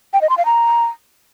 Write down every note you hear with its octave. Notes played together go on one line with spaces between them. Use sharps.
G5
D#5
C6
F5
A#5